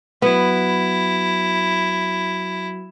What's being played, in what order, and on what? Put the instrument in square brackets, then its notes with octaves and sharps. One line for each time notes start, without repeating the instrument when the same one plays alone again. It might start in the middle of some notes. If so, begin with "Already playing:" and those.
[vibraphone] F#3 F#4 [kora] B3 [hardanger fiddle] E4